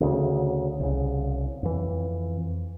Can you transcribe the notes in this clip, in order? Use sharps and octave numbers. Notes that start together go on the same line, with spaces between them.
D2 C#3
C2 C#3
F2 E3